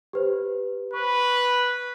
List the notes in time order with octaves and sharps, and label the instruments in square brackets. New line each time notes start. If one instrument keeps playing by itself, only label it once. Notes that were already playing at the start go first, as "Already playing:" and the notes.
[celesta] G4 B4 C5
[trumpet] B4 [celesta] C#6